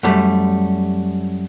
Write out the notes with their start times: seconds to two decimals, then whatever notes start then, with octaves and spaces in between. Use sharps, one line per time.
0.03 F#2 G3 A3